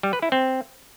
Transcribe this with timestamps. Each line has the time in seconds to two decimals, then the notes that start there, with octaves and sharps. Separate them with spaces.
0.03 G3
0.13 B4
0.22 E4
0.32 C4